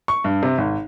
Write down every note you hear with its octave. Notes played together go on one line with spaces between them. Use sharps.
C#6
G2
C3
G#1